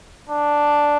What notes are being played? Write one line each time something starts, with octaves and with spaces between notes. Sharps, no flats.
D4